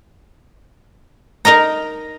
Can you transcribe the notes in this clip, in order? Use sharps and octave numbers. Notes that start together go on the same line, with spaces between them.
D#4 A#4 D#5 A#5